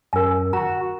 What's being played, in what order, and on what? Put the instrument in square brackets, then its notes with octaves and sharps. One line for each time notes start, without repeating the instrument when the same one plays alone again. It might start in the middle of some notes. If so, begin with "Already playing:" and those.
[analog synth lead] F#2 [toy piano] A#4 G#5
[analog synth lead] F#4 [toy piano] A#5